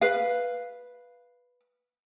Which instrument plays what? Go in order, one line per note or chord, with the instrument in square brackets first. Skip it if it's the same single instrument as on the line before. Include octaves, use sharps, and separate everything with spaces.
[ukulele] B4 F5